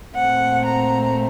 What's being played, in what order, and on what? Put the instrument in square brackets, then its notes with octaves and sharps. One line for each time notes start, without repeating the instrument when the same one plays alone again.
[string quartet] A#2 A3 C4 F#5
A#5